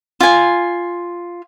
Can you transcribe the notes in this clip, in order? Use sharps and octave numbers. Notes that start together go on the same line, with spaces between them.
F4 G#5